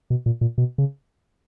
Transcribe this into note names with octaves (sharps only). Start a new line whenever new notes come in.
B2
A#2
A#2
B2
C#3